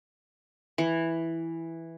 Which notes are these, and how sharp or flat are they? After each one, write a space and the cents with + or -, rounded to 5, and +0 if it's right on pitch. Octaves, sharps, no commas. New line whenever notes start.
E3 +0